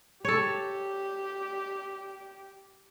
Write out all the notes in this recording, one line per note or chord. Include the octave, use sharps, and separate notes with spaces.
G4 A4 C#5